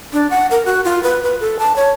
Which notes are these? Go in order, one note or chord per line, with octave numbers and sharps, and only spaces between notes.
D4
F#5
A#4
F#4
F4
B4
B4
A4
A5
C#5